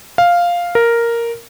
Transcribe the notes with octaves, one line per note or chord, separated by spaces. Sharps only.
F5
A#4